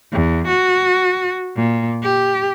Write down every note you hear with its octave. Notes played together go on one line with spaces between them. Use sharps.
E2
F#4
A#2
G4